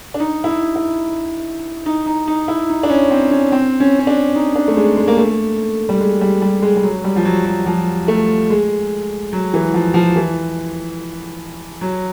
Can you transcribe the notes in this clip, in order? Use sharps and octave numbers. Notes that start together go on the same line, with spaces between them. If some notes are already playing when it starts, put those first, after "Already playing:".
D4
D#4
E4
D#4
E4
D#4
D#4
D#4
E4
D#4
D4
C#4
C4
C#4
C4
C#4
C#4
D4
D#4
D4
A3
G#3
G#3
A#3
A3
G3
G#3
G3
G3
G#3
G3
F#3
G3
F3
F#3
F#3
F3
A3
G#3
F#3
E3
F3
F3
E3
F#3